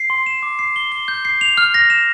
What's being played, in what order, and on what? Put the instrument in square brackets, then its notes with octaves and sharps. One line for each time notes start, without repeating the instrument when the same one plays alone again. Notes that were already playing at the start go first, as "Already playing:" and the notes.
Already playing: [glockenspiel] C7
C6
E7
D6
C7
G7
G7
G6
C7
F7
F6
A#6
E7